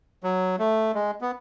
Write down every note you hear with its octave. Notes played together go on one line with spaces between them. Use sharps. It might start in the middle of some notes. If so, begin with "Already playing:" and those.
F#3
A3
G#3
B3